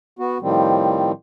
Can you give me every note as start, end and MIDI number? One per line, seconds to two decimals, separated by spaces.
0.19 0.38 59
0.19 0.38 66
0.41 1.12 45
0.41 1.12 51
0.41 1.12 53
0.41 1.12 55
0.41 1.12 60